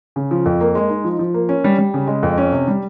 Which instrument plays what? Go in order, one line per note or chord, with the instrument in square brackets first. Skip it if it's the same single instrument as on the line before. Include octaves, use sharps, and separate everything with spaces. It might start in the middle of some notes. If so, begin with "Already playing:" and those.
[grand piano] C#3
F3
F2
A#3
G#3
D#4
F3
F3
A#3
C#4
G3
G3
C#3
G#3
F2
C#4
C3
G3